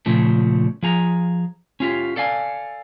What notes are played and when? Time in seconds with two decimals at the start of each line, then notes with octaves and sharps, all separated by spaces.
0.06 A#2 C#3 F3 A3
0.83 F3 G#4 A#5
1.80 C#4 F4 G4
2.16 A4 D5 F5 G#5